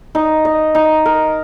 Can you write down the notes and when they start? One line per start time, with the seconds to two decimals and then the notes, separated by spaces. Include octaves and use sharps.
0.15 D#4
0.45 D#5
0.75 D#4
1.05 A#4